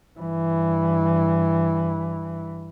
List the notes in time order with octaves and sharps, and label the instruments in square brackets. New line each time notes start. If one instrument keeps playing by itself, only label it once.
[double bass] G2 E3